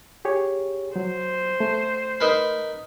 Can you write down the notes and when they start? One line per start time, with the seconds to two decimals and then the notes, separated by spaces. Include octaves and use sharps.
0.25 G4 G#4 C#5
0.96 F#3 C5
1.60 A3
2.20 D#4 A#4 B4